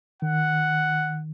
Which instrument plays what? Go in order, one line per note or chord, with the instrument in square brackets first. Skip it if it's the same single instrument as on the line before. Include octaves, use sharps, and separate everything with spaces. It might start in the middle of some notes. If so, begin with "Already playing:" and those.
[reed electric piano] D#3 [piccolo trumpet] F#5